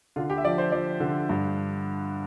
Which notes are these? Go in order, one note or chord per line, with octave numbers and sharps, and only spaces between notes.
D3 F4
G4
E5
F3 D5
C5
F3 D5
D3
G2